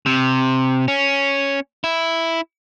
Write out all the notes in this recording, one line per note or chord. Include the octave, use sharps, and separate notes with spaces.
C3
C#4
E4